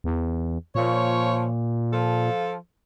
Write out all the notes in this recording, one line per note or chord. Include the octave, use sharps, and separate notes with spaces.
E2
A#2 F3 C#5
F3 F4 A4